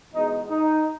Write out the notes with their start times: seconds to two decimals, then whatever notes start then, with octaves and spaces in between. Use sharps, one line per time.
0.13 E2 B2 G#3 D#4
0.50 D#4